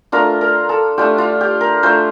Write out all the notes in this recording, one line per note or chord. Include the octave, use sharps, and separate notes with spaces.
A3 D4 F4 A#4
A#4
A4
A3 D4 F4 G4
F4
G4
A#4
A3 D4 F4 C5